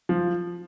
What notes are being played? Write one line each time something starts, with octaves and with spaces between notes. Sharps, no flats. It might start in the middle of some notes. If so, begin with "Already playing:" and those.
F3